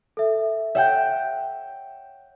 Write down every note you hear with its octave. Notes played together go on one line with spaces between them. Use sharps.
A4 E5
C#5 E5 F#5 G5